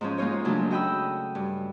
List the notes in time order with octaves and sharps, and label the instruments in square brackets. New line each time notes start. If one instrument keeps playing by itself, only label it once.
[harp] G#2 F3 C#4
G#3 A#3 D#4 F4 C#5 D#5
D#2 C#3 F#3 A3 D4
F#4 D#5 G5 B5 E6
G2